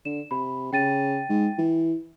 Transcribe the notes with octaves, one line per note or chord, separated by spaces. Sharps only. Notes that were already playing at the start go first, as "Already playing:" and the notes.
D3 E7
C3 B5
C#3 G5 A6 D#7
G#2
E3